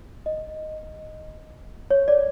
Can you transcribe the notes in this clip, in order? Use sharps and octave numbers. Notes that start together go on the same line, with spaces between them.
D#5
C#5
D5